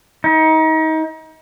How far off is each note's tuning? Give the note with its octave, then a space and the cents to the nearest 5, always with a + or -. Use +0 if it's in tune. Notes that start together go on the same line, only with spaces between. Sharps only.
D#4 +30